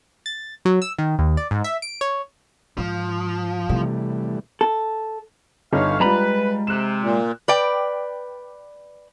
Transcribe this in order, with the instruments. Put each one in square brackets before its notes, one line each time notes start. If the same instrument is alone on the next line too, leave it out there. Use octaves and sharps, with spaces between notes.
[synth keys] A6
F#3
E6
D#3
D#2
D5
G#2
E5
D7
C#5
[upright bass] G#2 [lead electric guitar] F3
[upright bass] C3 [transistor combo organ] E3 G3 A3
[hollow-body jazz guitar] A4
[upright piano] G1 D#4 [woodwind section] C#5 F5
[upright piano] G3 F4 [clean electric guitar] G#3 A#5 B5 [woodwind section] B4
[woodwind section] C3 [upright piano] F#6 E7
[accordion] A#2
[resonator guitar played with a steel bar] B4 D5 G5